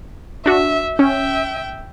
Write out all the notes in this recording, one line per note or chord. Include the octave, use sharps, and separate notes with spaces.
D4 F#4 E5
C#4 E5 G5